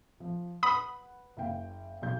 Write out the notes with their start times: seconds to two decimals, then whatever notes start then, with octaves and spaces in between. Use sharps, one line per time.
0.20 F3
0.63 B4 F#5 B5 D#6
1.37 F#1 F5 G5
2.02 B1 F#3 G6